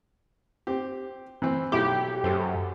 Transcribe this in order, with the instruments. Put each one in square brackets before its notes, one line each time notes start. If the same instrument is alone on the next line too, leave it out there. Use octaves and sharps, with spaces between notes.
[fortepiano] C4 G4
E3 C4
[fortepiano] B1 E4 D6 [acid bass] G4
[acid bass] F#2 [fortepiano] G4 A4 C5